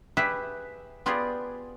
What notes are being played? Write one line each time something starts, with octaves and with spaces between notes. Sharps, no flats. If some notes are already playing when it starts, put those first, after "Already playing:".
G4 G#4 B4 E5 F#5 G5
B3 F4 G4 G#4 D5